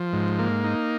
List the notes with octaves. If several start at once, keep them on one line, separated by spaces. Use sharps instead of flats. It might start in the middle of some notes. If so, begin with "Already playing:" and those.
Already playing: F3
G#2
A#3
D#4